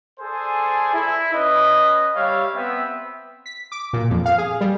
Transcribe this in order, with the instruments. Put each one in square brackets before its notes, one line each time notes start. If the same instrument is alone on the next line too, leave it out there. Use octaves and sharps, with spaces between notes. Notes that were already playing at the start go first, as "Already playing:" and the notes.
[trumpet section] G#4 A4 C5 D5 G#5
E4
C#4 B4 D#5
G3 G4 C#5 E5 F5
B3 C4 B4 E5
[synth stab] B6
D6
A#2
F2
F5
G#4
G3